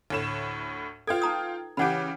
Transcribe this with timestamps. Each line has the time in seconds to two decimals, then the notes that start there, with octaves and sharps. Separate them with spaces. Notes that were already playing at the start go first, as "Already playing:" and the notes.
0.10 D2 A2 E7
1.07 F4 A4 B4 G5 G#6
1.22 D#4 A#5 D#6
1.77 C#3 E3 G4 F#5 B5